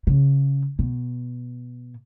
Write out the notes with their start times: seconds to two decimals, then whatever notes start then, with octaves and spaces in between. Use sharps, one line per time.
0.07 C#3
0.79 B2